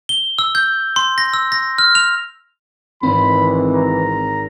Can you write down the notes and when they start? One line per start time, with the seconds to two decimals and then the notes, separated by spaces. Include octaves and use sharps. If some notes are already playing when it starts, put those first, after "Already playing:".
0.09 G7
0.39 E6
0.55 G6
0.96 C6
1.18 A#6
1.34 E6
1.52 A#6
1.78 F6
1.95 F7
3.03 G#1 G#2 E3 C4 B5
3.74 A#5